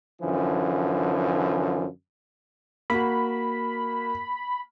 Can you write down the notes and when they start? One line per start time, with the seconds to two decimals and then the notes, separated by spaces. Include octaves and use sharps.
0.22 F#2 D3 E3 F3
2.90 A#3 F#4 B5